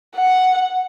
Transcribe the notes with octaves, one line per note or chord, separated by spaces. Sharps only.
F#5